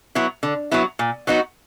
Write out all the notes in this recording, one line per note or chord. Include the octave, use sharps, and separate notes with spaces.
F#3 B3 E4
D3
F#3 B3 E4
A#2
F#3 B3 D#4 F#4